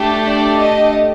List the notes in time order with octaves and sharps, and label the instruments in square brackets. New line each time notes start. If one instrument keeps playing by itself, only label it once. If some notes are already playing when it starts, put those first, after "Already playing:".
Already playing: [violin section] A3 D4 G4
D5
D#5